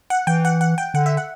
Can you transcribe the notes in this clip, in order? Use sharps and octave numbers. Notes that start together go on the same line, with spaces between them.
F#5
E3 G5
F#5
F#5
G5
D3 F#5
E5
F#5